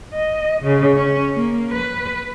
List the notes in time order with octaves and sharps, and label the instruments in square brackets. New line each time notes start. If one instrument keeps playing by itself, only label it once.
[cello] D#5
C#3
C#4
A#3
B4